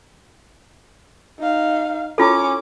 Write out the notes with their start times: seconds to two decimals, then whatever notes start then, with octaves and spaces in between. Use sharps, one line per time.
1.39 D#4 F5
2.18 C#4 E4 F4 A4 D6